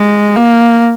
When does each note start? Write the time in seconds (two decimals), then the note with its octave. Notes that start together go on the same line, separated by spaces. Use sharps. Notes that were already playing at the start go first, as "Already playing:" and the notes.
Already playing: G#3
0.36 A#3